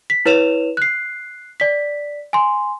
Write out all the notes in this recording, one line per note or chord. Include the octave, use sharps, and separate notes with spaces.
B6
E4 B4 C#5 E7 F7
F#6 C7
D5 B6
G#5 C6